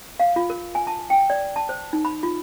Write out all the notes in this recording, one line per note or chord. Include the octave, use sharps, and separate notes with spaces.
F5
F4
A#4
G#5
A5
G5
D5
A5
C5
D#4
B5
F4